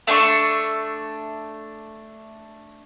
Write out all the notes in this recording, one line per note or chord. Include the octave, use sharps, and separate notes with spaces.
A3 D4 E5 C#6